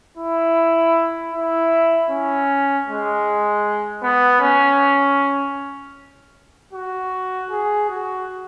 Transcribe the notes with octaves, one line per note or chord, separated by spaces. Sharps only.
E4
E4
C#4
G#3
B3
C#4
F#4
G#4
F#4